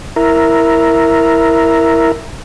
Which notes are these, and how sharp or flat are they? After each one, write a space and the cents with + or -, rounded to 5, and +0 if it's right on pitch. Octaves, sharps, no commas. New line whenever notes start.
E4 +0 A#4 +0